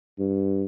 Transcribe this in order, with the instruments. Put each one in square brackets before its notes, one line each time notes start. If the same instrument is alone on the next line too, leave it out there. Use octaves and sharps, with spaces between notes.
[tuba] G2